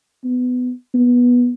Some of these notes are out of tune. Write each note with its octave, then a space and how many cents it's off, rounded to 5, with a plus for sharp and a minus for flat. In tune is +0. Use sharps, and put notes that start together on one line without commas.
B3 +15
B3 -15